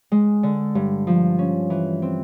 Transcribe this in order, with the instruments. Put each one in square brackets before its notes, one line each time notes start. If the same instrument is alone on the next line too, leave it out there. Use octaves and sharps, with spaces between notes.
[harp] G#3
D3
G2
F3
C#4
E3
C4